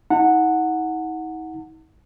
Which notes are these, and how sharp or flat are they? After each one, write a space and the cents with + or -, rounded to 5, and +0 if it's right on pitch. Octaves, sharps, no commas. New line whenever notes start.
D#4 +45 F#5 -10 A5 +40